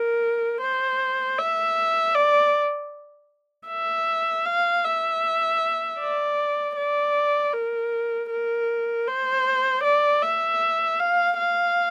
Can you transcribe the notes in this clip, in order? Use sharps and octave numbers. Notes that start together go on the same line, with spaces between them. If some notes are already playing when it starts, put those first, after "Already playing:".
Already playing: A#4
C5
E5
D5
E5
F5
E5
D5
D5
A#4
A#4
C5
D5
E5
F5
F5